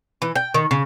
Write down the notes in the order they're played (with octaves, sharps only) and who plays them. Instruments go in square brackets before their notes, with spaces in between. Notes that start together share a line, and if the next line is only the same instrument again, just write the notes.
[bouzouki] E3
G5
D#3
C#3